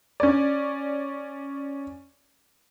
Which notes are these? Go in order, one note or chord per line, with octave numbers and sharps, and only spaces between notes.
C#4 D5